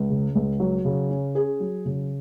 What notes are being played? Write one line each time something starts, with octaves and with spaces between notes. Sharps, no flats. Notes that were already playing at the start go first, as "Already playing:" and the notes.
Already playing: C#2
C#3
C#2
F#3
C#3
C#4
G#4
F#3
C#3